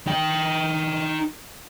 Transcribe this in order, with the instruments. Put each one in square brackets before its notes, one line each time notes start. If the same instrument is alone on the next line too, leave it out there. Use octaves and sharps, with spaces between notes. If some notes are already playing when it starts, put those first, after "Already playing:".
[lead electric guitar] D#4 G5